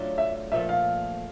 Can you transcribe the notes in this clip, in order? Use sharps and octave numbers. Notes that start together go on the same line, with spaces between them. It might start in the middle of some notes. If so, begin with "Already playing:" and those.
Already playing: F#3 A3 D4 F4
E5
A#2 F3 A3 E5
F5